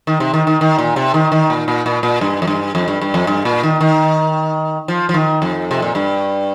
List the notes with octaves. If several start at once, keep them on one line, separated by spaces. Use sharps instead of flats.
D#3
C3
D#3
D#3
D#3
A#2
C3
D#3
D#3
A#2
A#2
A#2
A#2
G2
F2
G2
F2
G2
G2
F2
G2
A#2
D#3
D#3
F3
F3
D#3
F2
C3
A#2
G2